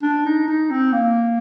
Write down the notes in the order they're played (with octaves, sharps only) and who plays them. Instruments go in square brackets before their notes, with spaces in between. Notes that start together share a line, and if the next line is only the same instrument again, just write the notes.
[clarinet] D4
D#4
D#4
C4
A#3